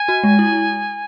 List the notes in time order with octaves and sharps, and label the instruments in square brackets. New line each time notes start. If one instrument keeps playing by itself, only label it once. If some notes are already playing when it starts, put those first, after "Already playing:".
Already playing: [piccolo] G#5
[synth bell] F#4
G#3
E4